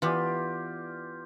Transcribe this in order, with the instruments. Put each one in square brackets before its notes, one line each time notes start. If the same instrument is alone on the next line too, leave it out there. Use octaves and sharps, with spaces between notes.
[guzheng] E3 B3 [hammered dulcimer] F4 G4 D5